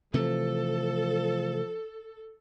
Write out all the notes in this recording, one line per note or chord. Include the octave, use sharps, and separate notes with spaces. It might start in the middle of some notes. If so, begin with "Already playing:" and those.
C3 E3 F3 A3 A4